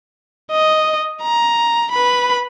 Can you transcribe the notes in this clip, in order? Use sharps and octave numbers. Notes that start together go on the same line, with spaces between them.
D#5
A#5
B4 B5